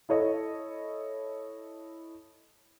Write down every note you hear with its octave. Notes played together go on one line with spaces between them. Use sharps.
E4 A4 C#5 D#5